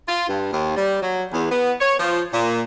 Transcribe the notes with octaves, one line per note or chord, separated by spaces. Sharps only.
F4
G2
D#2
G3
F#3
E2
B3
C#5
F3
A#2